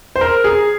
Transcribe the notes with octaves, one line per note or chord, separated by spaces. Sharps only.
C5
A#4
G#4